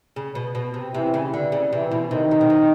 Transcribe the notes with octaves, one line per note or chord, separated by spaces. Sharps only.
C#3
B2
B2
C3
C3 E3 E4
C#3
D3
C#3
C3 E3 E4
B2
C3 D#3 D#4
C3
B2
C3